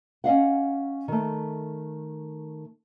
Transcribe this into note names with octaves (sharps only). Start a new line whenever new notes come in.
C#4 D#5 F5 F#5
D#3 A3